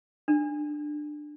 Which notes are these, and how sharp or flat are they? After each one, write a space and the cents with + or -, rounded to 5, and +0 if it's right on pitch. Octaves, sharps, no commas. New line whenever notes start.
D4 +20